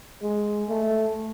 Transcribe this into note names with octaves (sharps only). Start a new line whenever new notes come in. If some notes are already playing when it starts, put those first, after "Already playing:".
G#3
A3